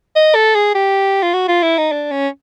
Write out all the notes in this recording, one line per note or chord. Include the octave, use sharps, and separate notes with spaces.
D#5
A4
G#4
G4
F4
F#4
F4
E4
D#4
D4
C#4